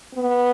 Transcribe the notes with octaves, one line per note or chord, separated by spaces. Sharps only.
B3